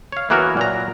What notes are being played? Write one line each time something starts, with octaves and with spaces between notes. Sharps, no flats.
C#5 F5
E3 A#3 B3 F#4 A#4 C#5
A#2 F#3 A#5